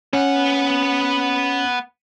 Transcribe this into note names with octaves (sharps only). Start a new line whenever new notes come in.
B3 C#4 F#5